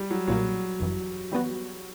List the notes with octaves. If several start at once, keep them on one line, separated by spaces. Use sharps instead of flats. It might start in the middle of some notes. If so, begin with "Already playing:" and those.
Already playing: G3
F#3
B1 A#2 F#3 A#3
G1 F#2 E3
E3 G3 B3 F#4